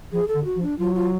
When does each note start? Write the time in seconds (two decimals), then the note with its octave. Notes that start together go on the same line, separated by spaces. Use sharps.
0.12 F3 G#4
0.28 A4
0.34 D3
0.45 F#4
0.56 F3
0.62 D4
0.78 F#3 F4
0.95 F4